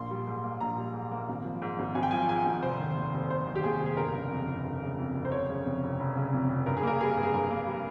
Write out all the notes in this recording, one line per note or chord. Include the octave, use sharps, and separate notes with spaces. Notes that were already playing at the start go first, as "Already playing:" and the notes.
Already playing: A#1 A#3 C6
G3
G#2
A#3
A#1 A#5
G3
G#2
A#3
G#1
F3
G#2
G#1
G#1 G#5
G5
F3 G#5
G#2 G#5
G#1
F1 C5
D#3
D#2
F1
F1 C5
D#3
G4
D#2 G#4
F1
G#4
G1 A#4
C#3
F2
G1
G1
C#3
F2
G1
C5
F1 C#5
C#3
F2
F1
F1
C#3
F2
F1
G2 A#4
G#4
A#3 A#4
G3 G#4
G2
G#4
G2 A#4
A#3
G3